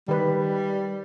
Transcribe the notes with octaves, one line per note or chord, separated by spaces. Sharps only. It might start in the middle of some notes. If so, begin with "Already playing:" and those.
D#3 G3 B4